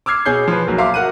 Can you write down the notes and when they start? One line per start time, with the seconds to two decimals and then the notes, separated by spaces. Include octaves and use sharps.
0.06 D6 E6 F6 G#6 C7
0.25 B2 G#4 C#5 G6 C7
0.48 F3 B4
0.67 B1 F#3 A#3
0.78 E5 F5 A#5 C6 D6
0.94 F#4 A#4 F#5 F#6 D#7